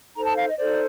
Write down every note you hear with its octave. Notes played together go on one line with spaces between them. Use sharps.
D#4 A4 C5 A#5
A5
F5
D#5
D#4 A4 C5 D5